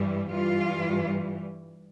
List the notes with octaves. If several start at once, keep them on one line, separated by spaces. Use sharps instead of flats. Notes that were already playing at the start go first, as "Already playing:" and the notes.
Already playing: G2 E3 G3
G2 E3 G3 F4